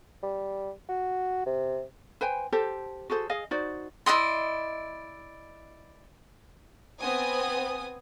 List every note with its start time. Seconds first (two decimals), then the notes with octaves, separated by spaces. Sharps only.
0.23 G3
0.89 F#4
1.46 C3
2.21 B4 C5 G5 G#5
2.52 G4 A4 C5 A5
3.10 F#4 G#4 A4 C5
3.30 G#4 D#5 F5
3.51 D#4 F#4 C5 D5
4.06 E4 D5 D#5 C6
7.00 B3 C4 G#5 D#6